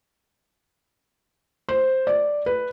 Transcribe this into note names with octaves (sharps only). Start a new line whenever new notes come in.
C5
D5
B4